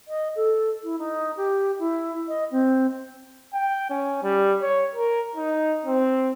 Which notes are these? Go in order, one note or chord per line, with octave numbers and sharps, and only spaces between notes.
D#5
A4
E4
D#4
G4
E4
D#5
C4
G5
C#4
G3
C#5
A#4
D#4
C4